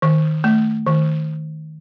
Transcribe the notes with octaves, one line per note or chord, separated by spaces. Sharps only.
D#3
A3
D#3